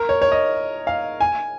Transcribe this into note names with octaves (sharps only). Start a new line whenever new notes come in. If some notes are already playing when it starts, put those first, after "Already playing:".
Already playing: A#4
C#5
C#5
D#5
F5
G#5